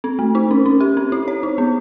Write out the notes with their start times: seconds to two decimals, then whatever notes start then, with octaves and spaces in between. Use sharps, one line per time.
0.04 C4
0.19 A3
0.35 D#4
0.51 C#4
0.66 C#4
0.80 G4
0.97 C4
1.12 E4
1.28 C#5
1.43 D#4
1.58 B3